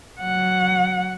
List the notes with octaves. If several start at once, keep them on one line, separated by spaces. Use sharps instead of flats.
F#3 F#5